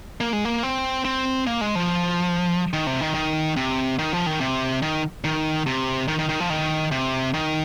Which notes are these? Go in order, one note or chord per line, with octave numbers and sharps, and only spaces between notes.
A#3
G#3
A#3
C4
C4
A#3
G#3
F3
D#3
C3
D#3
D#3
C3
D#3
F3
D#3
C3
D#3
D#3
C3
D#3
D#3
D#3
F3
D#3
C3
D#3